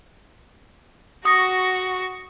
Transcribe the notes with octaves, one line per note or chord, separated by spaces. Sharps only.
F#4 C#6 D#6 A#6